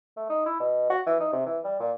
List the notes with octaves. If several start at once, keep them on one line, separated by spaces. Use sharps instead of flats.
A3
D#4
E4
B2
F#4
E3
D#4
C3
E3
G3
A#2